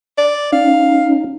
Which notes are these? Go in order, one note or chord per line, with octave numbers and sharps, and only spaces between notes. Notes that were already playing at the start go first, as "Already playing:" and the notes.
D5
C#4 D#4 F5